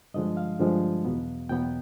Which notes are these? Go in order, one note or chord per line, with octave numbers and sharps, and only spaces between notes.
G2 D3 F3 G#3 D#5
F5
G2 D3 F3 G#3
E2 B2 F#3 B3
E2 B2 F#3 B3 G5